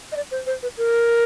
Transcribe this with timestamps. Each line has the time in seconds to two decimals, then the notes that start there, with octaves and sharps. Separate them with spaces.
0.12 D#5
0.16 D5
0.31 C5
0.47 C5
0.63 B4
0.77 A#4